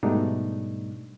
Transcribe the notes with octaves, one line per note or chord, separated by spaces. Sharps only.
G#2 B2 G3 A3 D4 D#4